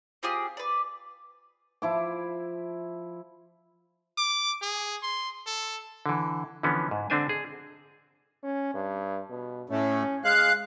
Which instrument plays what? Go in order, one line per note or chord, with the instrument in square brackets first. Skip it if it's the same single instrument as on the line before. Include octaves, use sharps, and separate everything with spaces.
[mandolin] C4 F4 G4 G#4
B4 D5
[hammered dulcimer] F3 E4 D6
[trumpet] D6
G#4
C6
A4
[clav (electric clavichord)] D3 E3
D3 E3 F3 B3 C#4
G#2
D3 C4 D4 C5 G#5
G#4
[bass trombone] C#4
G2
B2
[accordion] A2 A3 [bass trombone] C#4
[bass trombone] G#3 [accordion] F5 F#6